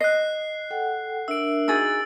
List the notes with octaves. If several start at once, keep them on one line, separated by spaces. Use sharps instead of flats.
D#5 F#6 C7
A4 F#5 G5
D4 A#4 E5 E6 D7
D#4 F#4 G#4 E6 A6